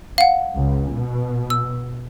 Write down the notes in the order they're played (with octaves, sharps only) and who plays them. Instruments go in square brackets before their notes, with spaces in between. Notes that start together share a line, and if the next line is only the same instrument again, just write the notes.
[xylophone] F5 F#5
[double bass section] C#2
B2
[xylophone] E6